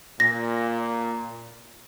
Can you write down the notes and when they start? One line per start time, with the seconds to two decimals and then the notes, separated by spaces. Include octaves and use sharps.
0.20 A#2 A#6